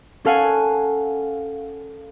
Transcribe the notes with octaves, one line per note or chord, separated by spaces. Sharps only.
C#4 A4 F5 F#5 G#5